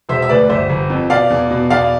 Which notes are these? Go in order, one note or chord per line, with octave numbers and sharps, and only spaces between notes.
E1 C5 E5
E5
D2 B4 D5
G1 C5 E5
G1
F2
B2 D5 F5
E2
B2
E2 D5 F5